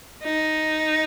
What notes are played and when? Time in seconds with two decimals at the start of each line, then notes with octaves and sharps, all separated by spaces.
0.24 D#4